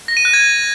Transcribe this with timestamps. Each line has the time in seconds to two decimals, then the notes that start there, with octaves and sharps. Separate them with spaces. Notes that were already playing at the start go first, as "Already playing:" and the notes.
0.08 A#6
0.17 D#7
0.25 F#6
0.33 G#6